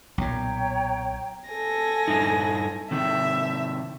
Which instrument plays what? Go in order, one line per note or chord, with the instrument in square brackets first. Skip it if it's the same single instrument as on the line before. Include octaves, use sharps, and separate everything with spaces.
[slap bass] B1 A#2 [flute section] C#5 G5 A#5
[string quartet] A4 G#5 A#6
[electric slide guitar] G2 D#4 E4
[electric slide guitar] C3 D#3 [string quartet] E5